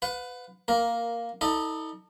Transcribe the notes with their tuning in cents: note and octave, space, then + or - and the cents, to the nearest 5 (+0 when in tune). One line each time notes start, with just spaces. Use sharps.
B4 +25 F#5 -40
A#3 +0 A#4 +10
D#4 +45 A4 +25 D#5 -40